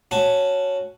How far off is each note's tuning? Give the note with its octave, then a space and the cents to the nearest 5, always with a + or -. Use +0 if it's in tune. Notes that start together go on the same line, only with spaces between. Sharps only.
C#4 +0 F#4 +0 A5 +0